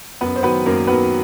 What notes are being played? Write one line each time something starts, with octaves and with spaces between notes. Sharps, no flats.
F#2 B3 B4
C5
D#3 F#3 B3 B4
F#2 A#3 A#4
D#3 F#3 B3 B4